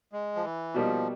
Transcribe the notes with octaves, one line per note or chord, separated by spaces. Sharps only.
G#3
F3
E3
B2 F3 G3 A#3 D#4 G4